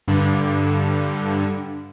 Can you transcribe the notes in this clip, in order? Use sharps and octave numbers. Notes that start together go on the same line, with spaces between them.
G2 D3